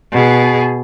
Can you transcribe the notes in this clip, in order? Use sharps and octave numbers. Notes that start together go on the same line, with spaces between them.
B2 G#4